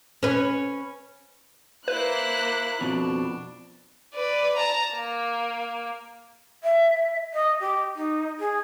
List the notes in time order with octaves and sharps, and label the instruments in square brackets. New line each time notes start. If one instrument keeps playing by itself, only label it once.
[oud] C#4 B4
[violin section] A#3 F#6 [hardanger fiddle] E4 C5 [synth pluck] B4
[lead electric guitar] F2 B2 [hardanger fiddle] D4
[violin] B4 D5
A5 A#5
A#3
[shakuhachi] E5
D#5
G4
D#4
G#4